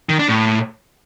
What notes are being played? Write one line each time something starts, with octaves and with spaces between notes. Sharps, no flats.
D#3
D4
A2